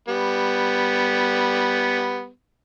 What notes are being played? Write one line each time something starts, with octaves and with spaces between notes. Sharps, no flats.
G3 B3